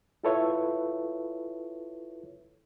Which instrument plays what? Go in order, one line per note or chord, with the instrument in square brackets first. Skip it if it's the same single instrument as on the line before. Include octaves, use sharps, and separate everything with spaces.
[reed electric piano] E4 F4 A4 B4 C#5 E5